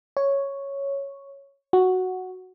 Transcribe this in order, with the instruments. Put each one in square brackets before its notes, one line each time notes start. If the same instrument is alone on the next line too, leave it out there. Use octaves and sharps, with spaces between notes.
[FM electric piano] C#5
F#4